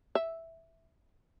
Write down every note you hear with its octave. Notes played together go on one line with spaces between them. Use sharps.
E5